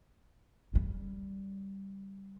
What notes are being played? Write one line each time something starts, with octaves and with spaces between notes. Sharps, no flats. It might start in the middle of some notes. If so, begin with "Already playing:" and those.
C#3 G3